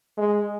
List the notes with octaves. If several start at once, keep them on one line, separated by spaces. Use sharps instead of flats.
G#3